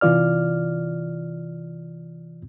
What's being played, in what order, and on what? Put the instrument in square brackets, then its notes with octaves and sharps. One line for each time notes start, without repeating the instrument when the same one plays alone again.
[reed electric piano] C3 E3 F4 D5 F6